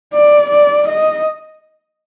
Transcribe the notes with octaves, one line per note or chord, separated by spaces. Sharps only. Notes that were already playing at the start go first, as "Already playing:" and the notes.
D5
D5
D#5